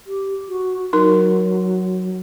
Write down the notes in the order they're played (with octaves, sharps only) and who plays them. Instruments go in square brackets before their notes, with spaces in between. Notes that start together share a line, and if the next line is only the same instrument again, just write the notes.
[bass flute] G4
F#4
[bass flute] F#3 [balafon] D#4 A#4